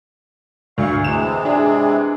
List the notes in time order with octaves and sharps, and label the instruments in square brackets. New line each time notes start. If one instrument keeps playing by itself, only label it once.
[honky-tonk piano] D2 [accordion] F5 C#6
[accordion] C3 E3 G#3 [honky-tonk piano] E7
[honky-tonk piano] D4 G#4